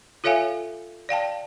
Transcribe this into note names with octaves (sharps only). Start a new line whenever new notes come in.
F4 A4 C#5 E5 F5 G#5
D5 F5 G5 A5